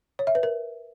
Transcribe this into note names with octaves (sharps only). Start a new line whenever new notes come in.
C#5
E5
B4
A#4